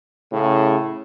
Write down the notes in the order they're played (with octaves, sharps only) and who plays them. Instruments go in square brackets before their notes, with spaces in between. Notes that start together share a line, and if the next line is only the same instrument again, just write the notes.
[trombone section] A2 C#3